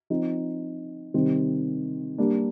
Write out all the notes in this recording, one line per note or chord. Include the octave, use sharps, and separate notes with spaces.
F3 C4 D#4
C3 D#3 G3 C4 D#4
G3 A#3 D4